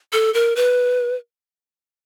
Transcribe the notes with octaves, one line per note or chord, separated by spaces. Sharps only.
A4
A#4
B4